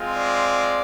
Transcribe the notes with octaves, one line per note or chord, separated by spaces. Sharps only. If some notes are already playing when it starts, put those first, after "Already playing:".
Already playing: G#3 C4 F4
D5